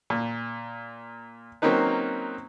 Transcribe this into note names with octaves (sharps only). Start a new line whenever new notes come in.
A#2
F#3 A#3 C4 C#4 D#4 B4